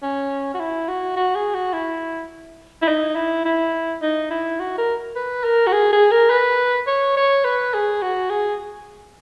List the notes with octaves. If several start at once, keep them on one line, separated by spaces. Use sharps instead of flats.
C#4
F#4
E4
F#4
F#4
G#4
F#4
E4
E4
D#4
E4
E4
D#4
E4
F#4
A#4
B4
A#4
F#4
G#4
G#4
A#4
B4
C#5
C#5
B4
G#4
F#4
G#4